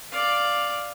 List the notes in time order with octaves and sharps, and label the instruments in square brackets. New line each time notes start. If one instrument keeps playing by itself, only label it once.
[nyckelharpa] D5 F5